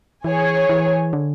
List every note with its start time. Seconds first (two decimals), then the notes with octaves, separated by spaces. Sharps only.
0.24 E3 G#4 C#5 G#5
0.69 E3
1.13 D3